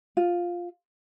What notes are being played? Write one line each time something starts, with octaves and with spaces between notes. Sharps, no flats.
F4